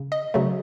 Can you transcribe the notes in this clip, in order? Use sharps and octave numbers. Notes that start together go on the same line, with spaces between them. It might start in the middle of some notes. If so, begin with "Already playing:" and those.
Already playing: C#3
D#5
C#3 F#3 A3